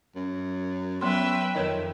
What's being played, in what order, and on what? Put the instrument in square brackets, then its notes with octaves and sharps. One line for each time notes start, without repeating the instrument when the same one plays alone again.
[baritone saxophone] F#2
[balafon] F#3 B3 C6 [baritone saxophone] C#4 [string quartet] B4 E5 G5
[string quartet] F2 [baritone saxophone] D#3 [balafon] B4 C#5 D#5